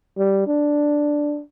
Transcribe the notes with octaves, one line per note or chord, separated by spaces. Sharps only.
G3
D4